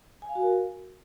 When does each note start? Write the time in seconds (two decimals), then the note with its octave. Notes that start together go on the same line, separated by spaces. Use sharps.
0.22 G#5
0.29 F5
0.35 F#4
0.42 A#4